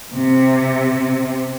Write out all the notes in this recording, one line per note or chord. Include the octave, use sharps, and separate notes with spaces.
C3